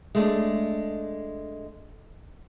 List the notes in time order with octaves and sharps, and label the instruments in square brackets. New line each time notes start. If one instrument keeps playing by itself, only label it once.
[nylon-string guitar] G#3 A3 D4